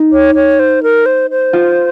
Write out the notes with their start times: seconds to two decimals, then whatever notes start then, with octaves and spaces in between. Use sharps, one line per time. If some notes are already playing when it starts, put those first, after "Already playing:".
Already playing: D#4
0.13 C#5
0.35 C#5
0.59 C5
0.83 A#4
1.06 C5
1.31 C5
1.53 F4